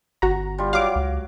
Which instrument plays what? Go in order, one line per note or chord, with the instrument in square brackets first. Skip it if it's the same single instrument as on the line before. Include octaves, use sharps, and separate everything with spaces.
[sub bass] G1 [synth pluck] F#4 A#5
[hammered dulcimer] G3 F4
[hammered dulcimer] F#3 [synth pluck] F5 D6
[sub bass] C#2